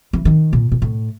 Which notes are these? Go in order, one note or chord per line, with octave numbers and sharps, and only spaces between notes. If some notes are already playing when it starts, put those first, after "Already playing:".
E3
D#3
A#2
A#2
A2